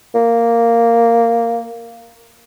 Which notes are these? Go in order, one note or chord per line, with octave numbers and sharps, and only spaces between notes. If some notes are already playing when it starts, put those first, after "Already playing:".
A#3